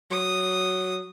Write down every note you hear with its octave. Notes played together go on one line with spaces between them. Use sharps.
F#3 D#6